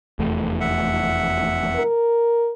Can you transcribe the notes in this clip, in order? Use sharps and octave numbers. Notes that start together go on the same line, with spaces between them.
F1 E2 A3
E5 F#5
A#4